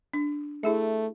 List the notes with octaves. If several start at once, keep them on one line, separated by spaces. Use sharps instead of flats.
D4
A3 E4 G#4 E5